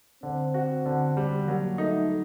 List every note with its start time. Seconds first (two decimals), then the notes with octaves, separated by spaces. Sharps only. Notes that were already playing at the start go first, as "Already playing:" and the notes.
0.23 D3 C4
0.54 F#4
0.86 D3
1.17 G3
1.47 F#3 A#3
1.78 A3 D#4